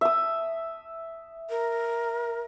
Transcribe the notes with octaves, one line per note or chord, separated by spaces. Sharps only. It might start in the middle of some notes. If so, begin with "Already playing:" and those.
E5 D#6
A#4